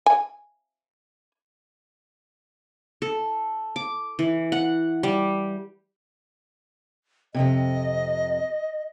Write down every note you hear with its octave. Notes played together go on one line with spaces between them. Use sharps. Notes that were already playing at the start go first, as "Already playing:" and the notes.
G#5
A4
D6
E3
F#5
G3
F2 G#2 C3 D#5